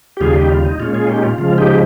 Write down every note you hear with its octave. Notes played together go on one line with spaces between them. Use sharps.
G4
D#2 C#3 G3 F4 G#4
D#4 G4
F4
D#4
A#2 G#3 C#4 F4
F4 G#4
D#4 G4
F4
C#3 F3 G#3 F4
D#4 G4